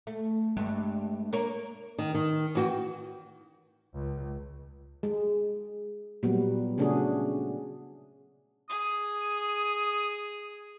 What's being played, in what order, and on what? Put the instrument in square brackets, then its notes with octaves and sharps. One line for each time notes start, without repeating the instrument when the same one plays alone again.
[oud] A3
[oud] G2 [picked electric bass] G#3 A3
[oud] A#3 A#4 C#5
[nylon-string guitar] D#3
D#3
E3 F#4 G5
[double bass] C#2
[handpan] G#3
A#2 F#3 G3 B3
C#3 A3 C#4 D4 F#4 G#4
[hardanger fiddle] G#4 [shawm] D#6